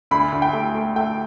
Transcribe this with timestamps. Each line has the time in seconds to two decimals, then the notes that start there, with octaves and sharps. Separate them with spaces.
0.11 D2 B5
0.32 D2
0.42 G5
0.53 A3
0.75 A3
0.96 A3 G5